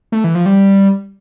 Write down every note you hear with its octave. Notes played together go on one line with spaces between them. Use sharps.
A3
E3
F3
G3